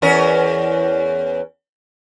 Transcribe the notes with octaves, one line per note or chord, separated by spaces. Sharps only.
E2 C#4 A#4